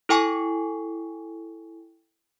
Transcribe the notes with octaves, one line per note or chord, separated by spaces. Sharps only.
E4 A4 G5 G#5 C#6